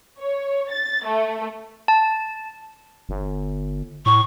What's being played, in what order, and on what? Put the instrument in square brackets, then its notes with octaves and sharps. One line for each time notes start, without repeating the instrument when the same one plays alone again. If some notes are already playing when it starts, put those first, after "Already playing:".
[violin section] C#5
A6
A3
[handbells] A5
[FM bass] G1
[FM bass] A2 [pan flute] C#6